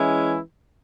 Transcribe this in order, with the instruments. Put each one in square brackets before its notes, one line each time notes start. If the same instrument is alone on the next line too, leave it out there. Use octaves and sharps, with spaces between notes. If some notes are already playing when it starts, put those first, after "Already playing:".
Already playing: [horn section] E3 G#3 C#4 E4